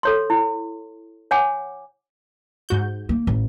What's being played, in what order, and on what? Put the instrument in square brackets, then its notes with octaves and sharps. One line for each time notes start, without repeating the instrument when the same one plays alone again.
[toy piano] A4 C#5 C6
E4
C#5 F#5 G#5 D6
[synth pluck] G#2 F#4 G6
[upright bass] A#3
A1